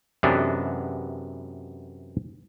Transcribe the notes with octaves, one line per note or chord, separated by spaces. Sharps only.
F#2 C3 E3 G#3 B3 D4